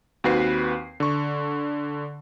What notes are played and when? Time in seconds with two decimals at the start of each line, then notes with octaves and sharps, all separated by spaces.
0.24 D#2 C4 F#4 B4 C7
1.00 D3 C#6